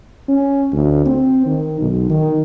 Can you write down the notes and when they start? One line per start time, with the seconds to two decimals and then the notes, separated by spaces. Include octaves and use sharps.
0.29 C#4
0.72 D2
1.06 C4
1.46 D#3
1.80 B1
2.10 D#3